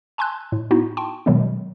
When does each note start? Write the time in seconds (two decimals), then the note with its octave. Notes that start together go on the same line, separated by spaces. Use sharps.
0.18 G#5 A5 C6 E6 F#6
0.52 A2
0.71 B3 D#4 E4 F#4
0.97 G5 A5 C6 C#6
1.26 B2 D#3 F#3 G#3 B3